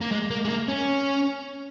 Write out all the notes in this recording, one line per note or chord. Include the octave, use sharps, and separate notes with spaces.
A#3
G#3
A#3
G#3
A#3
C#4